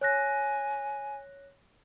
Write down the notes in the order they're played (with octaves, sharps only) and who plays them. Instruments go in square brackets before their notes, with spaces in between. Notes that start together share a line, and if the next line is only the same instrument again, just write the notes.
[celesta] C#5 F#6 A#6 [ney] G#5